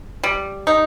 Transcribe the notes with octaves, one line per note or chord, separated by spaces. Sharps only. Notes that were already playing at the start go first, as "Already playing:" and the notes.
G3
D#4